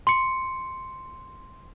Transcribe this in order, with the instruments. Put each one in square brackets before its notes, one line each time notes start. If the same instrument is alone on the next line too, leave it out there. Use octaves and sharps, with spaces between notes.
[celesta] C6 C#7